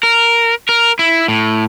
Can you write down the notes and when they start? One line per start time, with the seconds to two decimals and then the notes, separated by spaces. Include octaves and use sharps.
0.03 A#4
0.69 A#4
0.99 E4
1.28 A2